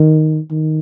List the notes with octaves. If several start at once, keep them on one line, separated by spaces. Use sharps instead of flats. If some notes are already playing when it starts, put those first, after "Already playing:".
Already playing: D#3
D#3